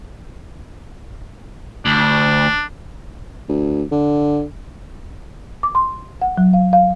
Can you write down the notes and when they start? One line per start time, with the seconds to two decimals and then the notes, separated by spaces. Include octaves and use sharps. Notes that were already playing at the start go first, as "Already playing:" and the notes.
1.86 D2 D4
3.49 D2
3.91 D3
5.63 D6
5.75 C6
6.22 F#5
6.38 F#3
6.53 F5
6.73 F5